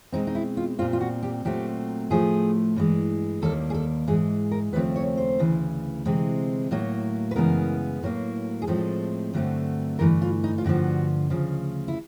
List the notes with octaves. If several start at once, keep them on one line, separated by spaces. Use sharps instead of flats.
B2 G#3 C4 D#4
D#4
E4
F4
A#2 G3 C4 F4
F4
F#4
G4
A#2 F#3 A3 C4 G4
A2 F3 A3 G#4
G2 E3 G#3
D#2 D#3 G3 A#3 A4
G#4
A4
G#2 E3 G#3 G#4
A#4
D#2 C#3 F3 A3 C4 B4
C#5
C5
D2 C#3 E3
C3 E3 G#3 C4
A2 F#3 A#3
B4
F#2 C#3 E3 G#3 B3 A#4
A2 F#3 A#3
G#4
A2 F3 G#3 C4 A4
G2 D3 F#3 A3 C4
G2 E3 A3 A#4
F4
D#4
F4
G2 D3 F3 F#4
D2 C#3 F3
E4